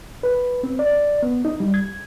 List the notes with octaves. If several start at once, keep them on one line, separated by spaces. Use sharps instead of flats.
B4
C4
D5
B3
D#4
G3
G#6